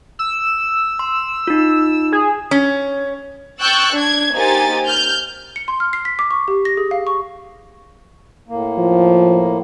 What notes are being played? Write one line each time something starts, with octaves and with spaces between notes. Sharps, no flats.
E6
C6
D#4 F4
G#4
C#4
G5 C#6 E6 F#6 G6 A6
D4 G#6
A#3 D#4 G4 C5 G#5 A6
F6 G6
C#7
C6
F6
C7
B6
D6
C#6
G4
A#6
G#4
F5
C#6
A2 A#3
F3